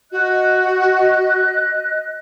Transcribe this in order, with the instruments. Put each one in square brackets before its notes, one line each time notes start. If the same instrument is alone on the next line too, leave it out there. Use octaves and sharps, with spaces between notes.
[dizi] F#4 [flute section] D#5 F#6